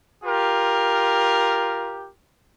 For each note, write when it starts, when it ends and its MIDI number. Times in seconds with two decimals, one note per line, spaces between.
0.24 2.09 65
0.24 2.09 67
0.24 2.09 70